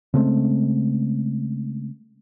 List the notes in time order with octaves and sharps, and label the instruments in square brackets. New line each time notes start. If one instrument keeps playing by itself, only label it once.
[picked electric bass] C#3 G#3 A3 C4